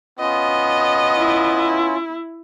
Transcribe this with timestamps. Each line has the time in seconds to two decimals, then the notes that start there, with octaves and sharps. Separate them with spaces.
0.19 B3 C#4 F4 D#5
1.18 E4